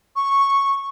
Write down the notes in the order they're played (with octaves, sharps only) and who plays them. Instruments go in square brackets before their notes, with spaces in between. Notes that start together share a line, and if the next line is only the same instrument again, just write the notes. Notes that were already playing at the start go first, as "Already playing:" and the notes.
[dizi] C#6